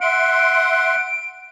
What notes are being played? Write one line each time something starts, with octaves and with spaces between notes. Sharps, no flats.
E5 F#5 C6 D7